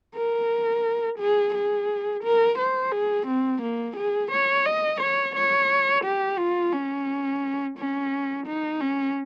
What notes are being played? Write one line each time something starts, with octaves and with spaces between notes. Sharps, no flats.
A#4
G#4
G#4
A#4
C5
G#4
C4
A#3
G#4
C#5
D#5
C#5
C#5
G4
F4
C#4
C#4
D#4
C#4